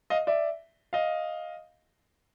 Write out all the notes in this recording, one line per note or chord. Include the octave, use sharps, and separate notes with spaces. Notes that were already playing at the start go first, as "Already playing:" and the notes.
D#5 F5
D5 E5
D#5 F5